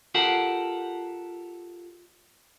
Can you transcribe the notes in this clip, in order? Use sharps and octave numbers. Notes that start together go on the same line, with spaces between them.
F4 G4 A4 A#4 F#5